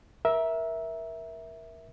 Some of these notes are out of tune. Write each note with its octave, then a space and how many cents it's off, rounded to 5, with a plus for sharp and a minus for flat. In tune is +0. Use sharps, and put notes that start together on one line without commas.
A#4 +20 E5 -10